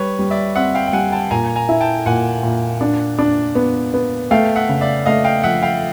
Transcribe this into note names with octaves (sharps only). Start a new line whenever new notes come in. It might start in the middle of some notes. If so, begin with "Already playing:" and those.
Already playing: G3 B4 C#5
G3
D5 E5
C4 E5 F#5
F5 G5
G5
G3 F#5 G#5
G5 A5
A#2 G#5 A#5
G#5 A#5
E4
G5 A5
A#2 F#5 G#5
A#2
D4
D4
B3
B3
A3 F5 G5
E5 F#5
C#3
D5 E5
A3 D#5 F5
F5 G5
F3 E5 F#5
F5 G5